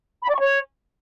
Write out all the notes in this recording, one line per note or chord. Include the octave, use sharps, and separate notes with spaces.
B5
D5
C#6
C#5